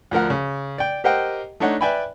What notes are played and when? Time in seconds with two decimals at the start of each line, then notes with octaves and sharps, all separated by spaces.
0.11 D2 F3 A#4 F#5
0.30 C#3
0.78 D5 G5
1.04 G4 A#4 C5 D#5 F#5 G5
1.60 A3 D4 D#4 C#5 F#5
1.81 B4 D5 E5 G5 G#5 B5